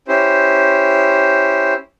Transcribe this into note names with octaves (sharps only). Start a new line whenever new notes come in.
C#4 E4 G4 C5